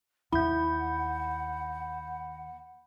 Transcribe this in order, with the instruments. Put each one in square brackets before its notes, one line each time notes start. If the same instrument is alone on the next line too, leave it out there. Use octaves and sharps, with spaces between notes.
[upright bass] D#2 [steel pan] E4 [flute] F#5 [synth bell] B5 G6